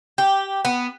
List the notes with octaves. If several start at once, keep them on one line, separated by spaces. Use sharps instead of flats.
G4
B3